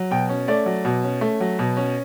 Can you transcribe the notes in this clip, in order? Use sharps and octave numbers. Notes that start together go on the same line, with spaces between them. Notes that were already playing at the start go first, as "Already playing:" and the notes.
Already playing: F#3
B2 G5
C#4
A3 D5
F#3
B2
C#4
A3
F#3
B2
C#4